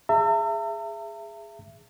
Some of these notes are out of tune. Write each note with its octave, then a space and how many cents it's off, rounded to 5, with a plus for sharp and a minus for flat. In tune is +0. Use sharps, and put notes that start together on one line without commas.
G#4 -10 E5 +25 A#5 -45